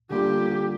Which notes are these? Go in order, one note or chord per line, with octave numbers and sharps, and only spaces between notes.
D3 G3 A#3 F4 G4